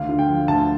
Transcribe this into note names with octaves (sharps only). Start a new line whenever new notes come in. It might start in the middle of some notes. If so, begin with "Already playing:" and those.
Already playing: D2 F5
D3
G5
F3
D2 A5